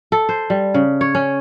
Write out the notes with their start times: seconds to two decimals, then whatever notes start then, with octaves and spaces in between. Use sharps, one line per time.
0.12 A4
0.29 C5
0.50 G3
0.74 C#3
1.01 C#5
1.15 C#4